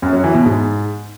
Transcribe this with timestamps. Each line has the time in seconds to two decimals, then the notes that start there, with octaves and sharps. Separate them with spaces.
0.02 F#2
0.13 F#3
0.24 E3
0.35 B2
0.45 G#2